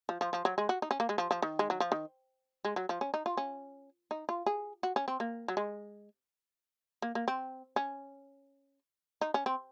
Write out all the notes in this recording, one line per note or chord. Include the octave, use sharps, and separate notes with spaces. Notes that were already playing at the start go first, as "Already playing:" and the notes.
F3
F3
F3
F#3
G#3
F#4
D#4
C#4
A#3
G#3
F3
F3
D#3
G#3
F#3
F3
D#3
G#3
F#3
F3
C#4
D#4
F4
C#4
D#4
F4
G#4
F#4
C#4
C4
A#3
F#3
G#3
A#3
A#3
C4
C#4
D#4
C#4
C4